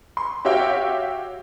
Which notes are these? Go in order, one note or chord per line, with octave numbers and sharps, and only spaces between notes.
C6
F#4 G4 C#5 E5 F5 G5